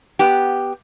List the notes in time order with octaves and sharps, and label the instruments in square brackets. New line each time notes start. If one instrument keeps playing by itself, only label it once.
[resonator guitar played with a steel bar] B3 G4